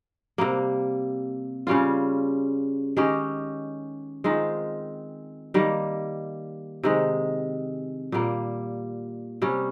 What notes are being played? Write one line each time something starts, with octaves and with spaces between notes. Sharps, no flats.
C3 G3 A#3
C#3 G3 C#4 F4
D#3 G#3 C#4 G4
D#3 G#3 C4 F4
D#3 G3 A#3
C3 D#3 G#3
A#2 G3 A#3
C3 G3 C#4